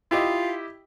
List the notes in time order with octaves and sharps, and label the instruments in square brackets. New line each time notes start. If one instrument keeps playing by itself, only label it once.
[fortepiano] E4 G4 D#5 [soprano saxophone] F4